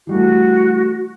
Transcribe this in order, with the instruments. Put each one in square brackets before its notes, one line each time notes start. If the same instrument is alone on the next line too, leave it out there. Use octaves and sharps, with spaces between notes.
[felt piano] E3 G3 A3 [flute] F#4